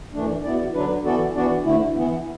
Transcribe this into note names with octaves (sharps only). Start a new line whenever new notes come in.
F#2 E3 A3 D4
E2 B2 B3 E4 D5
D3 F#3 D4 B4
E3 B3 F#4 A4 D5
E3 B3 D4 F#4 D5
D2 D3 A3 E4
E3 B3 E4